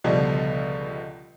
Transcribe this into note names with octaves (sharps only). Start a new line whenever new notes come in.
C#2 B2 D3 F3 G3